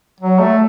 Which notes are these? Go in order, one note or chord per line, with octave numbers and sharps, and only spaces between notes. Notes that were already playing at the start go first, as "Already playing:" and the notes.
F#3
A3